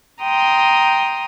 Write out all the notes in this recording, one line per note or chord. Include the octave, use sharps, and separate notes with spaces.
G5 A#5 C6 D#6